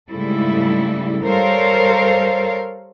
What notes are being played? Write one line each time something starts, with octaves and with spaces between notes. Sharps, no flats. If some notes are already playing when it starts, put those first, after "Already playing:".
G#2 C#3 G3 A3 E4 A4
G3 A4 A#4 C5 C#5 F5